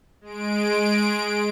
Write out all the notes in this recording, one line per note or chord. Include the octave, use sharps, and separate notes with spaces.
G#3 D7